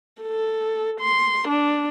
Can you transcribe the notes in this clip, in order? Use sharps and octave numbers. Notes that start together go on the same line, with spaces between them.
A4
C6
D4